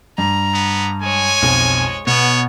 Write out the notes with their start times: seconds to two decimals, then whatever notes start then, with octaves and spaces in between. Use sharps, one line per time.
0.18 G2 A#5
0.54 B3
1.02 G#3 C#5 G#5
1.42 B1 F2
2.07 B2 B3 C#5